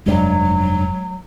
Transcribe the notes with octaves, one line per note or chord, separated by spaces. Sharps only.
F1 G2 F#3 G#3 D4